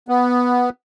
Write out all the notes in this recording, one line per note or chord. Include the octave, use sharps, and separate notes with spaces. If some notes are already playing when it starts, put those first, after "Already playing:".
B3